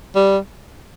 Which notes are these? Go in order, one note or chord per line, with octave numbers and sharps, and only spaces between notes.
G3